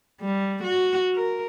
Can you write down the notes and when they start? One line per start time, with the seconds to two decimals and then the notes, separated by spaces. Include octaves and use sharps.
0.21 G3
0.64 F#4
1.15 A#4